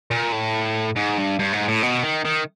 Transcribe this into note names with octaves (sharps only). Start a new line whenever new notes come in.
A#2
A2
G#2
G2
G2
G#2
A2
B2
D#3
D#3